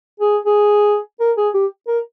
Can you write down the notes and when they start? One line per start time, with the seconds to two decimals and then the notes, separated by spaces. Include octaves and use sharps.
0.20 G#4
0.45 G#4
1.20 A#4
1.37 G#4
1.54 G4
1.87 A#4